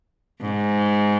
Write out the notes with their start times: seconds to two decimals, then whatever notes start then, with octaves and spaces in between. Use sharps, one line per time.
0.41 G#2